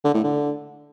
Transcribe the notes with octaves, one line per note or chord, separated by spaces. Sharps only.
D3
A2
D3